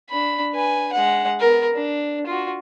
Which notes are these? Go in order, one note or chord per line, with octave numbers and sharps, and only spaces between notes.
D4 B5
B4 G#5
G#3 F#5
B3 A#4
D4
F4 F#4